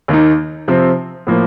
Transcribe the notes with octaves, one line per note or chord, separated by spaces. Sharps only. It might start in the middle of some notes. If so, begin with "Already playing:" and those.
D#2 D#3 A#3 D#4
C3 F3 C4
A2 F3 A#3